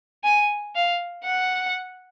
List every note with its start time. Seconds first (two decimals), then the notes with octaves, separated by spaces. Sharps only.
0.24 G#5
0.75 F5
1.24 F#5